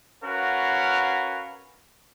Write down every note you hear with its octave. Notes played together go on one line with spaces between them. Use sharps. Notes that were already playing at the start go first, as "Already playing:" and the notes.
C#4 F#4 A#4 B4 F5 F#5